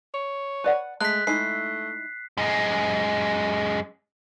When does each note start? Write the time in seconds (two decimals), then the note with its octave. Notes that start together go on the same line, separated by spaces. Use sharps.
0.14 C#5
0.64 B4 D5 F#5
1.01 G#3 A3 F#6 B6
1.27 G#3 A3 D#4 E4 C7
2.37 F#2 G#3